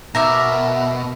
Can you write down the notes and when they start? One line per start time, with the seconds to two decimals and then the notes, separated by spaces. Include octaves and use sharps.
0.15 B2 A#4 E5 D6